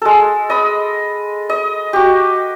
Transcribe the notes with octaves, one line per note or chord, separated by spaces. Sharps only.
G#3 A4
D#5 B5
D#5
F#4 G4